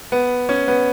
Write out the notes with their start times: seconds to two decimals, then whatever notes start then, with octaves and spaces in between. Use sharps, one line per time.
0.12 B3
0.49 C#4
0.68 B3